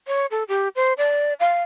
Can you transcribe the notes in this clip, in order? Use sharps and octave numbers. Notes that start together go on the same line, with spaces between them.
C#5
A4
G4
C5
D5
F5